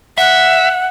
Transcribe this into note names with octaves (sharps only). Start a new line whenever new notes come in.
E5 F#5